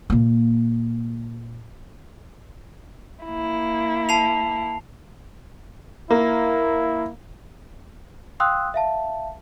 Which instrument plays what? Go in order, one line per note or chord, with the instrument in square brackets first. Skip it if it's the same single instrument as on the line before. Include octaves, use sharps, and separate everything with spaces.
[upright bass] A#2 A#3
[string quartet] A#3 E4
[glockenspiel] A5 C7 F7
[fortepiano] A#3 [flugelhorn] E4
[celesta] F5 G5 C6 D#6 E6 F#6
E5 F5 A5